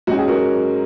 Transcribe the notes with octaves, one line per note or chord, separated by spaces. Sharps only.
G#2 F#3 C#4 F#4
G#4
F#4 A#4